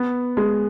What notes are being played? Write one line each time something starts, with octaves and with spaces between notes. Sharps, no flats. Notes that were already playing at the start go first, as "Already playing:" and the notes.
Already playing: B3
G#3